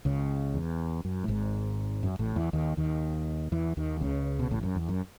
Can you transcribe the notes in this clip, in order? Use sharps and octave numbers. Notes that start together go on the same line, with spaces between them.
C#2 C#3
E2
F#2
A2
G#1 G#2
F#2
A1 A2
E2 E3
D#2 D#3
D#2 D#3
E2 E3
D#2 D#3
C#2 C#3
B2
A1 A2
F#2
E2
F#2